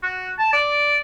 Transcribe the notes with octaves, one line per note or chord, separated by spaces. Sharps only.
F#4
A5
D5